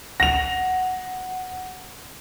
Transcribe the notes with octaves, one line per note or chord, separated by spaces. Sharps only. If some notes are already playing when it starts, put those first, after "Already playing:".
F#5 A#6 F7